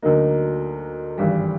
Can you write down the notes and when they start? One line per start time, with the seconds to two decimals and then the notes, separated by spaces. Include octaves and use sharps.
0.02 D2 D3 F#3 A#3 D#4
1.18 G#1 G2 E3 G3